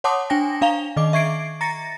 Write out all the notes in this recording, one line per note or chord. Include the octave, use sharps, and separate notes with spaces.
C#5 F#5 A5 C6 D6 D#6
D4 G5 G#5 A#6
D4 F5 A#5 F7 G7
D#3 D#5 D6
E5 C#6 G#6 C7 D7
A#5 A6 A#6 C#7